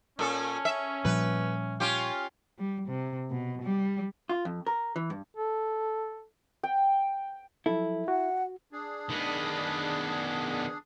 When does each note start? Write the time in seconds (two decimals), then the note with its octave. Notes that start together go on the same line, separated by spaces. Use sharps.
0.19 A#2 C#4 A4
0.65 E5
1.05 A#2 F3 G3 B4
1.80 C#4 F4 G4
2.59 G3
2.88 C3
3.30 B2
3.62 G3
4.29 F4
4.45 F2
4.67 A#4
4.96 E3
5.10 G2
5.37 A4
6.63 G5
7.66 F3 F#3 E4 A4
8.08 F#4 F#5
8.72 D4 G#4
9.09 D#3 B3